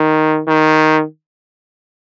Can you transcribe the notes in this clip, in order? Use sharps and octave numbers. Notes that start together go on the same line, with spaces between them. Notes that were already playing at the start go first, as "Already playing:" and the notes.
Already playing: D#3
D#3